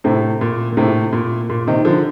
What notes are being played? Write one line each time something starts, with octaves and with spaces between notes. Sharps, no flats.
A2 C3
A#2
A#2
A2 C3
A#2
A#2
C3 D#3
D3 F3